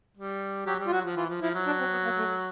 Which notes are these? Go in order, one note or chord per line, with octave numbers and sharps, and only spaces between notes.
G3
F#3 G4
G3
F4
F#3 F#4
F3
E3 F4
F3
F3 E4
F#3
D4
C4
B3
A#3
A3